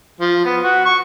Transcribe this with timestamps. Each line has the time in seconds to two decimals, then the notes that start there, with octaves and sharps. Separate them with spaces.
0.20 F3
0.45 B3
0.63 F#4
0.85 C#6